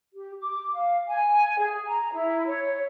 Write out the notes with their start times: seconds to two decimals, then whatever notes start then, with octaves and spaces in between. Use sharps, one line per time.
0.15 G4
0.40 D6
0.73 F5
1.08 G#5
1.58 G#4
1.86 A#5
2.13 E4
2.46 C#5